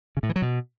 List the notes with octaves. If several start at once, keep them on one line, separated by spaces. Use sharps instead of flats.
C#3
A2
E3
F#3
B2